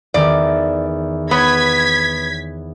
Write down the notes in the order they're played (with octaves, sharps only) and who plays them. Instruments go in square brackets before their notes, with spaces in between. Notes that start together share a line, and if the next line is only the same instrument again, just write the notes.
[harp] E2 D#3 [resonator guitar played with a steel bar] D5
[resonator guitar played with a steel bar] B3 [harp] C#5 [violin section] G#6 B6